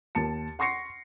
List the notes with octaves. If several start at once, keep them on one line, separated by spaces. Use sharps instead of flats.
D#2 A5 C#7
F#5 C6 C#6 A#6 C7 C#7